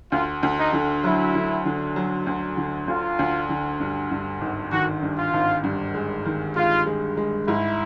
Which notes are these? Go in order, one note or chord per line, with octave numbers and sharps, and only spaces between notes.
D2 F4
D2
D#4
D3
F#3 E4
D3
D3
F#3
D2
D3
D2 F4
D2
D3
G2
G2
G#1
D#3 F#4
G2
F4
G#1
G2
G#3
D#3
G#3 F4
G#3
G#3
G#2 E4